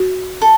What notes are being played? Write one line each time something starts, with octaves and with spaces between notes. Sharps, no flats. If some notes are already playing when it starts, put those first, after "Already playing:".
Already playing: F#4
A4